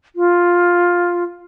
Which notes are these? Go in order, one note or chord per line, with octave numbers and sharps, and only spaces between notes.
F4